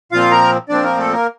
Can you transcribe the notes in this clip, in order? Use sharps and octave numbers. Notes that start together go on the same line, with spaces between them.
A#2 F3 C4 F4 F5
A#4 A#5
A#2 F3 C4 D4 D5
A#3 A#4
A3 A4
A#3 A#4